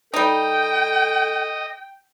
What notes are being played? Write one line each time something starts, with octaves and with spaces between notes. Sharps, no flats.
G3 D#4 A4 D#5 G5